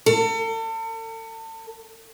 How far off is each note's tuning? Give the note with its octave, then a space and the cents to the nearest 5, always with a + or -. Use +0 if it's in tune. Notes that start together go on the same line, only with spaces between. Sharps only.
A4 +40